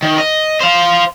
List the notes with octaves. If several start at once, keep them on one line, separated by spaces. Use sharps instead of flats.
D#3
D#5
C5 F5